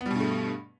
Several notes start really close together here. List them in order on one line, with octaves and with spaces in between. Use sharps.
B3 G3 B2 G2 A3